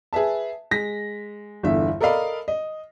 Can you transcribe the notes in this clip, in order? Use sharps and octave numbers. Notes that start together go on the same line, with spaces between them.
G#4 B4 E5 A5
G#3 A#6 B6
G1 E2 D3 E5
A4 A#4 D5 D#5 F5 B5
D#5